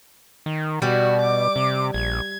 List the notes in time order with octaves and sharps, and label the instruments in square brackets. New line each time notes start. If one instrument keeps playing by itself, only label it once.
[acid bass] D#3
[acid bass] B2 [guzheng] G3 [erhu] F#4
[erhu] D6
[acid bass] C3
[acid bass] A#1 [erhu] G#6